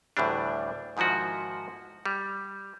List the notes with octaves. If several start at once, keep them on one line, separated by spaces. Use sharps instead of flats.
D2 A2 E3 G3 D4
G#2 D#3 F3 E4 F#4
G3